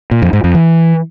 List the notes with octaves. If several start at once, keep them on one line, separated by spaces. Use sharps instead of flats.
A#2
F2
G#2
F2
E3